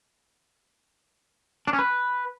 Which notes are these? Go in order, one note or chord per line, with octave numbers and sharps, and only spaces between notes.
D4
C#4
B4